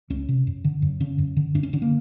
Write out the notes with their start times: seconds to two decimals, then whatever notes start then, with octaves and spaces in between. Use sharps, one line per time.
0.10 C#2 C#4
0.29 C3
0.47 F#2
0.64 D3
0.82 F#2
1.00 D3 C#4
1.18 F#2
1.37 D3
1.55 F#2 D4
1.63 C#4
1.73 D3 D4
1.82 A#3